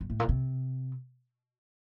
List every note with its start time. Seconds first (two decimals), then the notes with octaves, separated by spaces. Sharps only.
0.01 G2
0.10 A2
0.20 A#2
0.29 C3